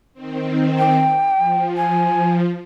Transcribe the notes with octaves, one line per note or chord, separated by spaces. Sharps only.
D#3 C4
G5
F3
G#5